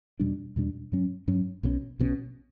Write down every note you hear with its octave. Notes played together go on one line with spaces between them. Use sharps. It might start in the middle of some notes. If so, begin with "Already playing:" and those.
E2 B2 G3 D4
E2 B2 G3 D4
G2 F#3 C#4
G2 F#3 C#4
B1 B2 F#3 C#4
B1 B2 F#3 C#4